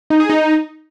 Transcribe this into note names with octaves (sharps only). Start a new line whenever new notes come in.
D#4
G#4
D#4